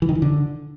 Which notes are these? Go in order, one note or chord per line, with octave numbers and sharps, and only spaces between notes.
E3
D#3
E3
D3